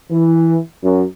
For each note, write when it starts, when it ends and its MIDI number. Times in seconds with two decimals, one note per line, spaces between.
0.10 0.58 52
0.83 1.03 42